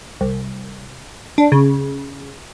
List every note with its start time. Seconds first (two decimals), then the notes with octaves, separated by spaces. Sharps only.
0.21 C2
1.38 D4
1.52 C#3